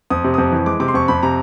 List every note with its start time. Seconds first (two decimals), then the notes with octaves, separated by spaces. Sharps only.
0.10 F2 D#6
0.24 C3
0.34 F2 D#6
0.52 E3
0.66 G#3 D6
0.80 C3 D6
0.88 C6
0.94 F2 C#6
1.08 F2 B5
1.23 C3 A#5